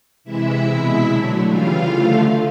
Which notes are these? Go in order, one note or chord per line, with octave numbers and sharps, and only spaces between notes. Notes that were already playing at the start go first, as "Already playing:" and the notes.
C3 E3 G#3 E4 E5
B2 G#3
D3 F#3 A3
C#3 E3 G3 F4 F5
D3 F3 A3